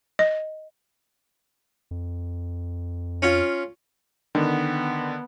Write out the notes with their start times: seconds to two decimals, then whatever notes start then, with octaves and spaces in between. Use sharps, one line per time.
0.19 D#5
1.91 F2
3.22 C#4 F4
4.35 D3 D#3 B3